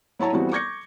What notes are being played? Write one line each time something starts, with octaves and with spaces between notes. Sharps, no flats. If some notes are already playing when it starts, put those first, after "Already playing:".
F#3 E4 C#5 A5 A#5
F2 E3 G3 B3 C4 F#4
C#6 D6 G6 G#6 A#6 C#7